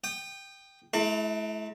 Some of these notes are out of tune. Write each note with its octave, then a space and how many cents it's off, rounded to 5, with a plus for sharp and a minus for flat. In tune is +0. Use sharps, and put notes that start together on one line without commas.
G5 +0 D#6 -35
A3 -45 E4 +0 A5 +40